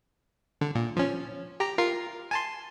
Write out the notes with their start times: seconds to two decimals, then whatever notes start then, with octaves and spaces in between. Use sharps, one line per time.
0.61 D3
0.75 A#2
0.97 F3 C#4
1.60 G4 A#5
1.78 F4 A#4 C7
2.31 G#5 A5 C6